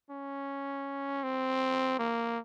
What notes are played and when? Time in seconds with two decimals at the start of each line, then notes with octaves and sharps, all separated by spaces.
0.10 C#4
1.23 C4
1.99 A#3